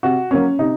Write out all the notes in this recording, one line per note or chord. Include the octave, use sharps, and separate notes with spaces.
C3 F#4
F#3 A#3 C#4
C3 D#4